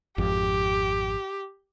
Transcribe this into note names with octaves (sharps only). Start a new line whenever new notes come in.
G#1 F2 G4